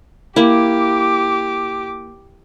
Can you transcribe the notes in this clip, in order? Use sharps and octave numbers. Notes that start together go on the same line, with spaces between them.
A#3 E4 G4 D6